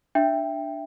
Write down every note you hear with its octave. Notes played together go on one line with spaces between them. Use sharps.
D4 E5 G5